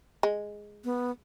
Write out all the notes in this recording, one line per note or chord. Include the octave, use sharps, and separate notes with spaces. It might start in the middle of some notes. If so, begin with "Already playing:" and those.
G#3
B3